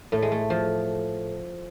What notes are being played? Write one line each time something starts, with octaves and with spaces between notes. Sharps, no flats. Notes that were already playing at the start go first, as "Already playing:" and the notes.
A2 A3
G#3
A3
F3